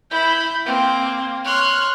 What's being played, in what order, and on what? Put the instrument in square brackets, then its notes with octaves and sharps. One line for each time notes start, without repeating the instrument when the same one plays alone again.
[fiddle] E4 [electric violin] B5 G6
[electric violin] A#3 [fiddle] C4
[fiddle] C#5 C6 [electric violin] F6 F#6